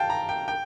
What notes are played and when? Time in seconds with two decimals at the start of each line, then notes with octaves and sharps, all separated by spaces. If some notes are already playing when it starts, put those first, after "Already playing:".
Already playing: F5 G5 A5
0.10 A#5
0.29 G5
0.48 G5